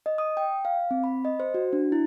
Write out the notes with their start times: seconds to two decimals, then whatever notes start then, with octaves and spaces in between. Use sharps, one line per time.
0.06 D#5
0.18 D#6
0.37 G5
0.65 F5
0.91 C4
1.04 B5
1.25 D#5
1.40 C5
1.54 F#4
1.73 D4
1.92 E4